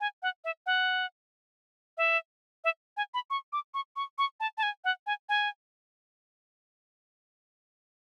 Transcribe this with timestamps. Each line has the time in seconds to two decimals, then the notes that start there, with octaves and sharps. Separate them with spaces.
0.01 G#5
0.22 F#5
0.44 E5
0.66 F#5
1.98 E5
2.64 E5
2.97 G#5
3.14 B5
3.30 C#6
3.53 D6
3.74 C#6
3.96 C#6
4.18 C#6
4.40 A5
4.58 A5
4.63 G#5
4.84 F#5
5.07 G#5
5.29 G#5